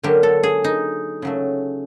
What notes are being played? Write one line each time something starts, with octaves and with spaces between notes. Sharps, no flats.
D3 F#3 A#3 G4
A4
G#4
D#4
C#3 F#3 A3